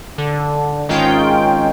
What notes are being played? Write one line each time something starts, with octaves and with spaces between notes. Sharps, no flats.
D3
G#1 D#3 G#3 C#4 F4 G5